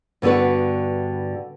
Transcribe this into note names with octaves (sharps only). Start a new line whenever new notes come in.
G2 D3 B3 F#4 B4